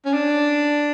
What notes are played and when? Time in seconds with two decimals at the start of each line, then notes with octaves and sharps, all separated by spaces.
0.05 C#4
0.13 D4